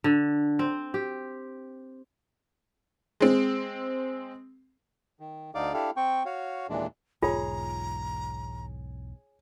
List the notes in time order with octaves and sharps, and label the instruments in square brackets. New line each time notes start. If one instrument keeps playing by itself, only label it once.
[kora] D3
C4
G4
[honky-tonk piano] G#3 C4
[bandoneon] D#3
D2 D3 D#4 D5 F5 D6
D4 E4 G4 A4 F5
C4 G5 C#6
F#4 C#5 F5
D#2 A#2 E3 G#3 D4
[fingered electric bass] B1 E2 G#2 [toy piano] F4 [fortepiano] G#4 C#5 [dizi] A#5